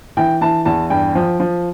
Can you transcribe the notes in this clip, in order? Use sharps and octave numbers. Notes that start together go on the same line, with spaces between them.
E3 G5
E3 A5
E2 A5
G2 G5
F3
F3